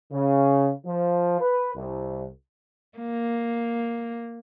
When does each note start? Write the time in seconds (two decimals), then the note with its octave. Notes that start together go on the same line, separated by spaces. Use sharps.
0.11 C#3
0.85 F3
1.40 B4
1.74 C2
2.99 A#3